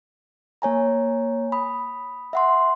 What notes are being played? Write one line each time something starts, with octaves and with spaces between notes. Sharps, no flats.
A#3 C#5 G#5 A#5
B5 D#6
E5 F#5 C6